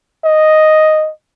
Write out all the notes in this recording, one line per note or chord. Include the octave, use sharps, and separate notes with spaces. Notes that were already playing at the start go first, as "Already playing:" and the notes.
D#5